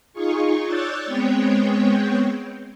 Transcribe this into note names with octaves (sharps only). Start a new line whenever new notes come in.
D#4 F4 G#4 C#6
C#5 D5 E6 F#6 G6 A6
G#3 B3 C4 C#5 G5